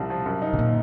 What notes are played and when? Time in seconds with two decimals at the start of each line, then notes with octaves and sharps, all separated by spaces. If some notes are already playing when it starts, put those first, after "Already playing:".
Already playing: C2 C3 F3
0.10 F3
0.26 F#2
0.42 D#4
0.53 C3
0.59 A#2